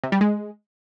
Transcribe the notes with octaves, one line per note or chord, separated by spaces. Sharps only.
C3
G3
G#3